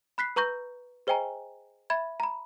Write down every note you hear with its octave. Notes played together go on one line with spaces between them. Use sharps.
B5 F#6 B6 C7
B4 A#5 C#6 G6 A#6
G#4 C5 D#5 G5 G#5 A#5
E5 B5 G#6
A#5 B5